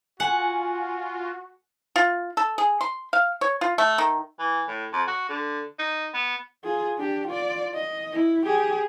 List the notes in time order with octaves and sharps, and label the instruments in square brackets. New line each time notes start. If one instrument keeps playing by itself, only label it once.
[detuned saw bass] F4 [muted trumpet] F#4 [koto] F#5 [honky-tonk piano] G#5
[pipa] F4
A4
G#4
C6
F5
C#5
F4
A3
D#3
[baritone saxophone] E3
A2
F2
F#4
D3
D#4
B3
[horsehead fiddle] F4 G#4
D4 G4
F4 D5
D#5
E4
G4 G#4